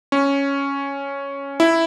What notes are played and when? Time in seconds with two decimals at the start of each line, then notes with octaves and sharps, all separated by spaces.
0.12 C#4
1.60 E4